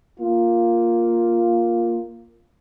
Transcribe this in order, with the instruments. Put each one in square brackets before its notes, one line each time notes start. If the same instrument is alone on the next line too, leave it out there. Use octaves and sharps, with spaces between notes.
[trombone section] A#3 F4